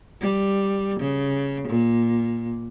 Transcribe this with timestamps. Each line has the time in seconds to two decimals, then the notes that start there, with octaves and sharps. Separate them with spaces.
0.21 G3
1.00 C#3
1.68 A#2